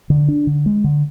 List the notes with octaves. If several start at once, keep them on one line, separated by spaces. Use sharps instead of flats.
D3
D4
D3
G#3
D3